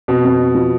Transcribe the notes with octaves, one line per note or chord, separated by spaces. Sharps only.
F2 B2
F2
F2
F3